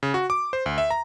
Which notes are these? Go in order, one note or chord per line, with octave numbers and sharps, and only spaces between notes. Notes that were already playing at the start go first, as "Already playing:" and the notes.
C#3
F#4
D6
C5
D2
E5
A#5